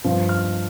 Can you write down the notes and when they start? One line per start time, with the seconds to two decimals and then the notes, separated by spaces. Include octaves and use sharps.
0.04 G2 F3 C4
0.29 F6